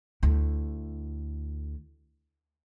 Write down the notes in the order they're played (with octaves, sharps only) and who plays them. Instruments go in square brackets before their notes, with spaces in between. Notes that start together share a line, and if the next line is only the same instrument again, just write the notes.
[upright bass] D2 E4